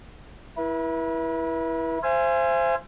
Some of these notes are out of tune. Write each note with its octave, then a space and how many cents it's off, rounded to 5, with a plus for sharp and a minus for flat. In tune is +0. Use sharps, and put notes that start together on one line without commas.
E4 +0 B4 -40
C5 +0 E5 +45 G#5 +0